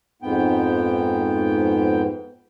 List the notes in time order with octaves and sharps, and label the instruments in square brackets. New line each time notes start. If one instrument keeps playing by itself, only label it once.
[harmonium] F2 G#2 B3 G5